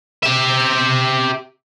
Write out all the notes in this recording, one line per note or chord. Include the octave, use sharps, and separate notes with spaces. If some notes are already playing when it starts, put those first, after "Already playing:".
G4 E5